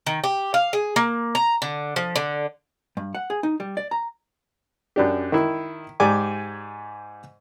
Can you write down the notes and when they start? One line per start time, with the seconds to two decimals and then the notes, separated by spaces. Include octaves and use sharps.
0.06 D#3
0.24 G4
0.54 F5
0.73 G#4
0.96 A#3
1.35 A#5
1.62 D3
1.96 F3
2.16 D3
2.97 G2
3.15 F#5
3.30 G#4
3.43 D#4
3.60 G3
3.77 D5
3.91 A#5
4.96 F#2 D4 G4
5.32 D#3 E4
6.00 G#2 G4 D5 G#5 D6